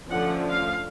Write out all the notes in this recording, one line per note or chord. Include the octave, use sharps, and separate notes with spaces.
D3 F3 A3 C#4 F#5
F5